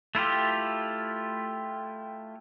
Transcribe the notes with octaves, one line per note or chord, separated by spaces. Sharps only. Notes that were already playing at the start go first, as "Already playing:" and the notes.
A3 E4 F4 G4